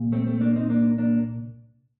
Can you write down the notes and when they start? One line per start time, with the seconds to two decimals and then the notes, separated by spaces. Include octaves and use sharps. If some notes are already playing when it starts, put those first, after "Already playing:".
Already playing: C2 A#2
0.12 A3 C4
0.27 A3 C4
0.41 A#3 D4
0.56 C4 D#4
0.70 A#3 D4
0.98 A#3 D4